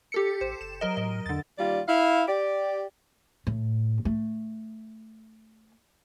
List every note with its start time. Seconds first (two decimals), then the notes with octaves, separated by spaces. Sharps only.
0.12 G4 A4 C#7
0.41 A1 C5
0.61 F#1 E7
0.81 F#3 A#4 D#5
0.97 A2 D#5
1.26 E2 D3 A6
1.59 D#2 G3 F4 D5
1.88 E4 F5
2.28 G4 D5
3.47 A2
4.05 A3